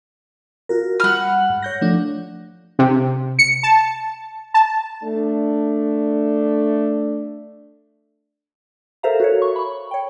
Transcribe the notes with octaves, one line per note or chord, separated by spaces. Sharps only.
F4 F#4 A#4
G3 F#5 B5 F6
G#2
C#5 G6 A#6
F3 A3 D4
C3
C#7
A5
A5
A3 D4
A4 A#4 C5 E5 F5 A#5
F#4 A4 C#5
C#6
B5 C#6
C#5 G5